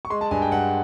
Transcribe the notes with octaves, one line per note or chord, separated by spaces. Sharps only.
C#6
G#3 C6
A5
G2 G#5
G5
G2 F#5